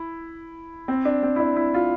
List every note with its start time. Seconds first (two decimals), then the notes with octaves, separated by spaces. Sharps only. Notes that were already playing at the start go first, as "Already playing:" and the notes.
Already playing: E4
0.88 C4
1.05 D4
1.23 C4
1.36 E4
1.40 D4
1.56 E4
1.74 F4